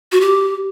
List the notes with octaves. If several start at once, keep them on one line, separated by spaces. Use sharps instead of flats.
F#4
G4